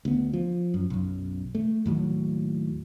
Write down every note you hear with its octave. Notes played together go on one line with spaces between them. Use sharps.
D2 B3
F3
F#2
B1 F#2
A3
D#2 A2 F#3